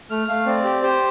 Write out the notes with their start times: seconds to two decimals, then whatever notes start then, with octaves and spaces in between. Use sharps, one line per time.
0.10 A3 F6
0.28 A3 F5
0.46 C4 D5
0.64 G4
0.83 G4 C5